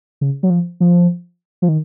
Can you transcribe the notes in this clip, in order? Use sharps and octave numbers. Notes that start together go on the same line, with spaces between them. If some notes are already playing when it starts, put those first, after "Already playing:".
C#3
F#3
F3
F3
F3
D#3